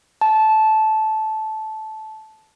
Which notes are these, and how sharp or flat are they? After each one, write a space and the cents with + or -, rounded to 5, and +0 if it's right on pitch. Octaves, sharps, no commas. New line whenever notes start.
A5 -15